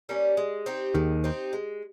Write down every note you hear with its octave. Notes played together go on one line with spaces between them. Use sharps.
G3 A#3 C#4
G#3
C4 D#4 G4
D#2 D#3 G#3
C4 D#4 G4
G#3